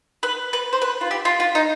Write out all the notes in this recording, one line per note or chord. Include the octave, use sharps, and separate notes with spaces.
B4
B4
C5
B4
F4
G4
F4
F4
D#4